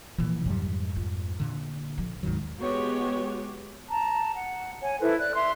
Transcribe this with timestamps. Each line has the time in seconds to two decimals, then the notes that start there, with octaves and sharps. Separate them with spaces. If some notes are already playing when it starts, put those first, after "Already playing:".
0.18 A#2 E3 F3
0.46 F2 G#2 D#3 F#3 G3
0.96 F4
1.40 A#2 D3
1.98 D3 F3
2.23 D#2 G#2 D#3 F#3
2.60 G#3 B3 F#4 G4 C#5
3.88 A5 A#5
4.35 F#5
4.81 C#5 G#5
5.00 E4 A4 B4 C5
5.18 D5 F#6
5.35 E5 C6